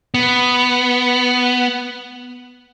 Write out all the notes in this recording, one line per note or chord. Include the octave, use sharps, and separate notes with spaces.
B3